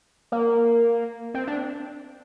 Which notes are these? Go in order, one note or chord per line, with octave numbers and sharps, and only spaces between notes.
A#3
C4
D4